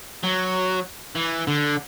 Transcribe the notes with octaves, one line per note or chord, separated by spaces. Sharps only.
F#3
E3
D3